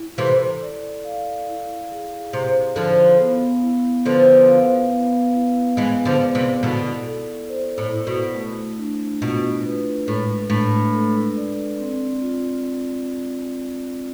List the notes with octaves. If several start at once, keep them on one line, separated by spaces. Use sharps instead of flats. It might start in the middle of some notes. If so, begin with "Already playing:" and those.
Already playing: E4
C3 E3 A4
D5
F5
E4
G#4
C3 C5
D3 F3 F5
B3
E4
D3 F3 B4
F5
B3
E4
E3 G#3 G#4
D3 F3
D5
C3 E3
B2 D3 E4
A4
C5
A2
E4
B2
A3
D4
B2 F4
B4
A2 G#3
A2 D4
A4
D5
C4
F4